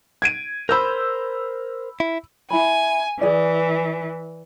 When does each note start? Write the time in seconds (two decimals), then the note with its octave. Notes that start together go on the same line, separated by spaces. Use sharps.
0.22 G#6 D7 D#7
0.69 A#4 C5 B5 E6 G6
2.00 E4
2.51 E4 G#5 B5
3.21 E3 G#4 D5